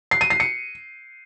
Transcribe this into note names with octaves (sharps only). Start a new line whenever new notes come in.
C7
D#7
C7
C#7